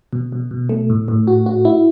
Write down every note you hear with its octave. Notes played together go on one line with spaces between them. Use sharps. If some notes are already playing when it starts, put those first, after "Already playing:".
B2
B2
B2
A3
A2
A2
F#4
F#4
E4